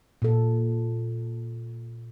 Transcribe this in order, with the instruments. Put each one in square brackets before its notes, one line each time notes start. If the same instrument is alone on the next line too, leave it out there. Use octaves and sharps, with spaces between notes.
[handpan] A#2 A4